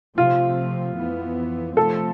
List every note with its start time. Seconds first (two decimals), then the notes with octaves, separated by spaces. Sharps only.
0.17 C3 F3 A3 C4 F4
0.97 F2 E3 B3
1.77 C3 F3 A3 C4 A4